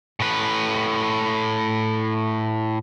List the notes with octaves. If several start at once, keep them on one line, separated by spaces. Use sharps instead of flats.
A2 B4